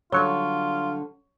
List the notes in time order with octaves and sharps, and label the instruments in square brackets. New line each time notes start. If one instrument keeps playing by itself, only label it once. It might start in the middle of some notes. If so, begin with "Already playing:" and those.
[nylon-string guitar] D3 G3 [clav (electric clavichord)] F#3 [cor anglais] F4 [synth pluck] C#5 C#6